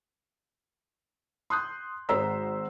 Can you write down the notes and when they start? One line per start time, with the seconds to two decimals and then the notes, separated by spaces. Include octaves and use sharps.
1.50 C6 D#6 F#6 G6
2.09 G#1 G#3 C5 A#5 E6 B6